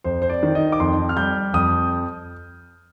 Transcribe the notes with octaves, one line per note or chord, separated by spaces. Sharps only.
F2 C5
C5
D5
D#3
D#5
D6
F2 C6
F6
G3 G6
F2 D#6